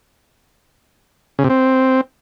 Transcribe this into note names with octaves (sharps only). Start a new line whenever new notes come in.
C#3
C3
C4